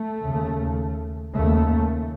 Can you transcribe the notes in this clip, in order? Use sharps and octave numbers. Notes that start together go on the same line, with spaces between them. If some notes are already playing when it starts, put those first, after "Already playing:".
Already playing: A3
D#2 C#3
D#2 C#3 A3